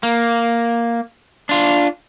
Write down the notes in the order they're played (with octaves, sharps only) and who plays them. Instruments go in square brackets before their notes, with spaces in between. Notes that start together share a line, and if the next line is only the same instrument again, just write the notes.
[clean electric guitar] A#3
D4 F4